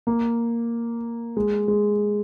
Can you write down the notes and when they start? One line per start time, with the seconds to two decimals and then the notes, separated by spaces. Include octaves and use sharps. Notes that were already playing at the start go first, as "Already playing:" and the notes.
0.07 A#3
1.37 G#3
1.68 G#3